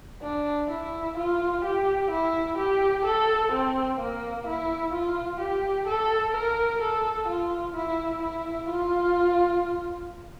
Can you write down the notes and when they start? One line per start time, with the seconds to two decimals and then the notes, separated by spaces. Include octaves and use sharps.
0.23 D4
0.70 E4
1.18 F4
1.65 G4
2.11 E4
2.58 G4
3.05 A4
3.52 C4
4.00 A#3
4.47 E4
4.93 F4
5.40 G4
5.87 A4
6.34 A#4
6.82 A4
7.28 F4
7.75 E4
8.22 E4
8.69 F4